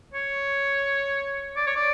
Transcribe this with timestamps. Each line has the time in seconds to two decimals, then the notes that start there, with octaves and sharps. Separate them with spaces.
0.13 C#5
1.57 D5
1.67 C#5
1.76 D5